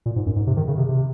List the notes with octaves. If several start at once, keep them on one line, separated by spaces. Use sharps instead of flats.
A#2
G#2
F#2
G#2
C3
D#3
C#3
C3
C3